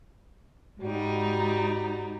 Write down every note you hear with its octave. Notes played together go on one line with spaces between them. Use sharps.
G#2 G3 D#4 F#4